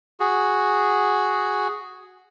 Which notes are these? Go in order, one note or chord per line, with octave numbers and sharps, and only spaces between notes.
F#4 G#4